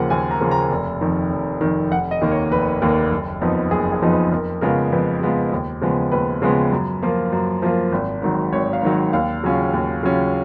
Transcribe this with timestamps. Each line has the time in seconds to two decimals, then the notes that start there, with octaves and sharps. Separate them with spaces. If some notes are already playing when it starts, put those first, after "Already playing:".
Already playing: D#2 C#3 F3 A#3 F#5
0.10 D#2 G#5
0.31 A#5
0.40 C#3 F3 A#3
0.51 A#5
0.70 F1
1.01 F2 D#3
1.31 F1
1.61 F2 D#3
1.91 F1 F#5
2.11 D#5
2.21 D#2 D#3 A#3
2.31 C#5
2.51 F1 B4
2.82 D#2 D#3 A#3
3.12 F#1
3.42 F2 F3 B3 D#4
3.71 F#1 G#4
3.92 G#4
4.02 F2 F3 B3 D#4
4.11 B4
4.32 F2 A#4
4.61 C#3 G#3 B3 F4 A#4
4.92 F2 B4
5.21 C#3 G#3 B3 F4
5.53 D#2
5.81 C#3 F3 G#3 B3
6.12 D#2 B4
6.42 C#3 F3 G#3 B3
6.72 F#2
7.03 F3 A#3 F4
7.32 F#2
7.62 F3 A#3 F4
7.92 G#1
8.22 G#2 D#3 F#3
8.53 G#1 C#5
8.73 F5
8.82 G#2 D#3 F#3
9.13 D#2 F5
9.43 C#3 F#3 C#4 F4
9.74 D#2
10.03 C#3 F#3 C#4 F4